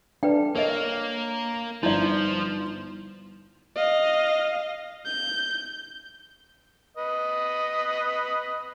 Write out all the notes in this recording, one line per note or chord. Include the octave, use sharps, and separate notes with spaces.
D4 B4 G5
A#3 A#4 C#5 D#5
G1 F3 D#4 E4 D5 G6
D#5 F5
G6
B4 D#5